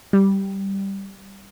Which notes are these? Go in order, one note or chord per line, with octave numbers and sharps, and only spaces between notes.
G3